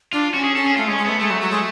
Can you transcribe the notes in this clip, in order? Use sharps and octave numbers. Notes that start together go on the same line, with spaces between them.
D4 F4
C#4 F#4
G#4
C#4 A4
G#4
A3 F4
G#3
C#4
G#3
A3 B3
G#3 A3
F#3
F#3
G#3